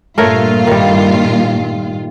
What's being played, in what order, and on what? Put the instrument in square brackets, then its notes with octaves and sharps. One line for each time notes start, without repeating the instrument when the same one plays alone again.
[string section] G2 A#2 F4 [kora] A3 A#4 C#5
[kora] D#3 G3